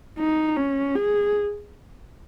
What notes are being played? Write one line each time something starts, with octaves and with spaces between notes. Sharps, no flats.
D#4
C#4
G#4